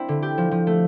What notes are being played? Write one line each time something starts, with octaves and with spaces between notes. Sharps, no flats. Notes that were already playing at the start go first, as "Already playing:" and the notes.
Already playing: A#3 C4 D4 E4
D3
G4
F3
F3
A3